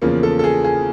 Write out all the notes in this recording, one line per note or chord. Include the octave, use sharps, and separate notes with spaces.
E2 C#3 F3 A#3
A4
A4
G#4
G#4